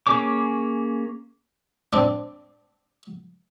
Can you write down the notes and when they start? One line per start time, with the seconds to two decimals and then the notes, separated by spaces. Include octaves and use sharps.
0.07 A#3 C#4 G#4 C#5 D6
1.93 C4 D4